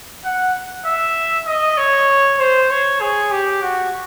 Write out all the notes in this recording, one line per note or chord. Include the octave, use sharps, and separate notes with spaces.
F#5
E5
D#5
C#5
C5
C#5
G#4
G4
F#4